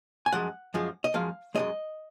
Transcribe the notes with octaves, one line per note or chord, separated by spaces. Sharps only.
G#5
F#2 F3 G#3 F#5
F#2 F3 G#3
D#5
F#2 F3 G#3 F5
F#2 F3 G#3 D#5